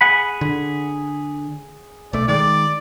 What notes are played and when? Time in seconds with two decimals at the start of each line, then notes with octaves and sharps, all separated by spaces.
0.01 G#4 F#5 B5
0.41 D3
2.13 B1 A3 D5
2.28 D#3 G#3 D5